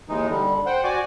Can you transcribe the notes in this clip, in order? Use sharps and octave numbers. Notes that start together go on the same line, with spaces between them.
D#2 E3 G#3 D#4
D3 G3
C5 F#5 G5
F#4 D5 G#5 D6